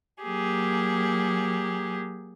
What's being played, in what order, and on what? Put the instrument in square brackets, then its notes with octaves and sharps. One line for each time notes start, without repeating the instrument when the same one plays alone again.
[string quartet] F#3 A#3 G4 G#4